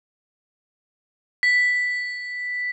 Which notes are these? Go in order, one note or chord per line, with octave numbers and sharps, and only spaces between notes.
B6